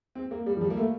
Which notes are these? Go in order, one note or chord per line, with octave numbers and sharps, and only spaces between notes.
C4
A#3
G3
F3
G3
A#3
A3